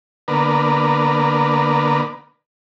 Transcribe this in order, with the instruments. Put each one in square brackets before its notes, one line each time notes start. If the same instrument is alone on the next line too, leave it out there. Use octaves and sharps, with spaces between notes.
[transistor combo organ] D3 A#3 B3 A#4 B4 D5